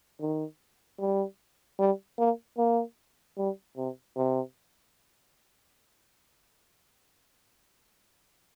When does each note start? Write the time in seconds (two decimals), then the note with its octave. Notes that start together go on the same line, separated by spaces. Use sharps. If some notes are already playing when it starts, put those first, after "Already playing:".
0.21 D#3
1.00 G3
1.79 G3
2.19 A#3
2.58 A#3
3.37 G3
3.77 C3
4.17 C3